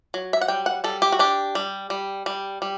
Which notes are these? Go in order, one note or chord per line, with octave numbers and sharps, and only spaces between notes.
F#3
E5
F#5
G3 G5
F#5
G3 A4
G4
F#4
D4 G4
G3
G3
G3
G3